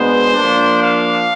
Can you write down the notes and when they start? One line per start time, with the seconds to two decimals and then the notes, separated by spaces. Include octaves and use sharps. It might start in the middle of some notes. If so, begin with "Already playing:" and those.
Already playing: B2 G#3 B3 D4 C5
0.34 F3 A#3 D4
0.79 F5